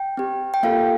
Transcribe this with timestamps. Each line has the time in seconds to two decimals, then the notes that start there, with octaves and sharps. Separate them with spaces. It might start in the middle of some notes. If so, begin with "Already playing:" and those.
Already playing: G5
0.17 C4 G4
0.54 G5
0.63 A#3 F4 A4 F5